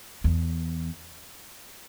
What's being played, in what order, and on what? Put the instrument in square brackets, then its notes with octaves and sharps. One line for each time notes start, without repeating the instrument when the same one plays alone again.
[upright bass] E2